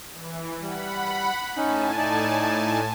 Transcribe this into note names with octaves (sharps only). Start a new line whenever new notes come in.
E3
G3 F#5 B5
A2 C#4 D#4 G#5 A5
D#4 D5